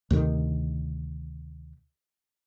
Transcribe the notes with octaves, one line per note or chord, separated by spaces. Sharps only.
D2 C3 D#3